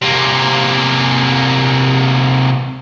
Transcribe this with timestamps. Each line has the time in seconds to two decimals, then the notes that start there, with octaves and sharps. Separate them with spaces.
0.02 C3 A#3